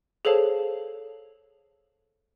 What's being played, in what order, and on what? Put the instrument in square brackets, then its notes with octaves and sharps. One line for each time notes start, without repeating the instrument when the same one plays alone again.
[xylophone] G#4 A4 C5 C#5 F5 A5